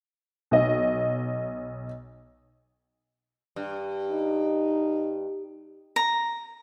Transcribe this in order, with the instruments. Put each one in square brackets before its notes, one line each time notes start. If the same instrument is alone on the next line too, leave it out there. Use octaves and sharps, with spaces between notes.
[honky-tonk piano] B1 D#5
[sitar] G2
[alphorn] D#4
[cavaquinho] A#5